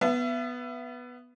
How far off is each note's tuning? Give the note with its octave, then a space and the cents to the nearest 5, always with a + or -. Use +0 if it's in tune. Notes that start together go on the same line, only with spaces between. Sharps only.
B3 +0 E5 +35